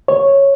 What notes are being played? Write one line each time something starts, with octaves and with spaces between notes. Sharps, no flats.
C#5